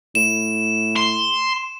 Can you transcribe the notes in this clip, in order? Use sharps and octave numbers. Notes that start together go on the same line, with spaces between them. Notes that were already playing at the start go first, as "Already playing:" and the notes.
A2 E7
C6